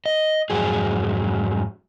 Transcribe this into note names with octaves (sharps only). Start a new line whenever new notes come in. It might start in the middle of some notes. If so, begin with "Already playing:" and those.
D#5
F2 G#2 F#3 G#4